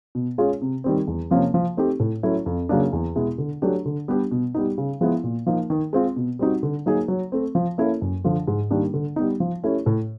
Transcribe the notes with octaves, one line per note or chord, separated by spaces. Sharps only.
B2
G#3 C#4 F4 G#4
C3
D#3 G3 C4
E2
C3 F3 A#3 C#4
F3
A3 C4 D#4 G4
A2
F#3 A3 C#4 E4
F2
C#3 F#3 A#3 D4
E2
B2 G#3 B3 E4
D3
F#3 A3 D4 G4
D3
G3 B3 D4 G4
B2
G3 B3 D#4
C#3
F3 G#3 B3 E4
A#2
F3 A#3 D#4
D#3
G#3 C4 F4
B2
G3 C4 D#4 F#4
D3
F#3 A#3 D#4 G#4
F#3
A3 C4
F3
A#3 C#4 E4 A4
F#2
D3 F3
G#2
D#3 G3 A#3 D4
D3
G3 B3 D#4
F3
A3 C#4 E4 G4
A2